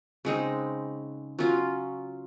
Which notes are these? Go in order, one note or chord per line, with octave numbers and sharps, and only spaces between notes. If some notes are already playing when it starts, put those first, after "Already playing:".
C#3 G#3 C4 D#4
F#3 C#4 F4